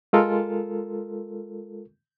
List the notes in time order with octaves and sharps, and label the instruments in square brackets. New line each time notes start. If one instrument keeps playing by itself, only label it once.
[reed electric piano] G#3 F4 A4 A#4